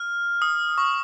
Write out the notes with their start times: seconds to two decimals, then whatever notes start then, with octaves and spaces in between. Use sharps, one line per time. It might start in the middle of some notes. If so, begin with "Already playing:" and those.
Already playing: F6
0.42 D#6
0.78 C#6